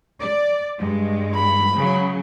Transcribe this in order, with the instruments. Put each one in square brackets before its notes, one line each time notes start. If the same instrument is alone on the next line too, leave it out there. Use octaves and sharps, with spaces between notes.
[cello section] D5
G2 G#3
[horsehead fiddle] B5
[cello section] C#3 F#3